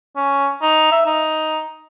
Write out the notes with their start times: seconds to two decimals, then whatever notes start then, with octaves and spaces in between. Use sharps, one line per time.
0.16 C#4
0.62 D#4
0.92 E5
1.06 D#4